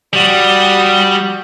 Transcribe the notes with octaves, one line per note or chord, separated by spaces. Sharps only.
G3 F#4 D#6